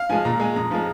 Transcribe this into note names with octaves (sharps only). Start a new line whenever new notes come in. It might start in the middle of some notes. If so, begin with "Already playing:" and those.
Already playing: F5
F3 G#3 G#5
A#2 A#5
G#3 G#5
F2 A#5
F3 G#3